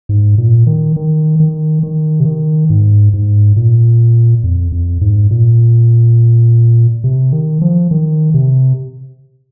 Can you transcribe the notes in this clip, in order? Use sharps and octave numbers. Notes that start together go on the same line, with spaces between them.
G#2
A#2
D#3
D#3
D#3
D#3
C3
D#3
G#2
G#2
A#2
F2
F2
G#2
A#2
C3
D#3
F3
D#3
C3